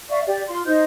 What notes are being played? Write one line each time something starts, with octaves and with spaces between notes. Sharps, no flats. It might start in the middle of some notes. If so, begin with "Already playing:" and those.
D5 E5 F5 C#6
G4 D5
F4 C6
D#4 C5 D#5 G6